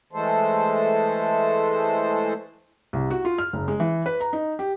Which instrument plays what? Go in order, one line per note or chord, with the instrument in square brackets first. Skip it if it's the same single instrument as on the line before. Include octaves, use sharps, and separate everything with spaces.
[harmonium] E3 G#3 A3 A4 C5
[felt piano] C2
F#4
F4
F6
F#1
G#3
E3
B4
A#5
D#4
G4